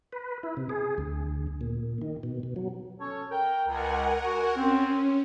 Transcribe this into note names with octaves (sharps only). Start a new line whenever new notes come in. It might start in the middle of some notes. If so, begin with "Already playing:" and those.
B4
E4
C3
G#4
D2
A#2
D#3
B2
B2
F#3
C#4 A4 C#5
A#4 G5
C#2 A#4 F#5 G#5
F#4
C4 C#4